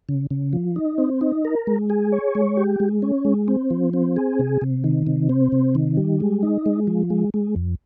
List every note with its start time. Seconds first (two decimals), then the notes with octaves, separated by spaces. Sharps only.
0.09 C#3
0.31 C#3
0.53 F3
0.76 D#4
0.98 C4
1.21 D#4
1.45 A#4
1.67 G#3
1.90 G#4
2.12 C#5
2.35 G#3
2.57 G4
2.80 G#3
3.02 C#4
3.25 G#3
3.48 C4
3.70 F3
3.93 C4
4.16 G#4
4.39 C3
4.62 C3
4.84 D#3
5.07 C3
5.29 C4
5.52 C3
5.75 D#3
5.97 G3
6.20 G#3
6.43 D#4
6.66 G#3
6.87 F3
7.10 G#3
7.34 G#3
7.56 F2